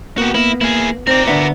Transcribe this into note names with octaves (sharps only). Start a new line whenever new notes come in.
A#3 B3 F#4 G4
A#3 B3 E4
A#3 E4 G#4
C4 D#4 A#4 D5
D3 B3 D4 E5